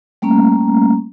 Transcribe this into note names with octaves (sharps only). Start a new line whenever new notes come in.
G3 A3 A#3 C#4 A#5